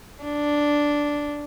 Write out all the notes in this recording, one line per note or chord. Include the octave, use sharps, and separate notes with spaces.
D4